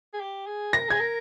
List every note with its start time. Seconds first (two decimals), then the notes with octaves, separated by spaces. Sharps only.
0.14 G#4
0.21 G4
0.47 G#4
0.73 A#4 A#6
0.89 G#4 G#6
1.00 A#4